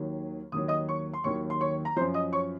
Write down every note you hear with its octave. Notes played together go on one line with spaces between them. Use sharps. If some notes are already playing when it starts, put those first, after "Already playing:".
Already playing: D#2 D#3 F#3
D#2 D#3 F#3 D#6
D#5 D#6
C#5 C#6
C6
D#2 D#3 F#3 C#5 C#6
C6
C#5 C#6
A#5
F#2 F3 C5 C6
D#5 D#6
C#5 C#6